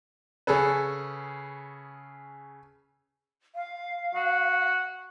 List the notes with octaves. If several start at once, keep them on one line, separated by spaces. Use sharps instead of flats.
C#3 C#4 G#4 A4 B4
F5
F#4